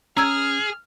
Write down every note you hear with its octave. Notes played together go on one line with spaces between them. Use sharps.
C#4 G#4 A#5 E6 F6 G#6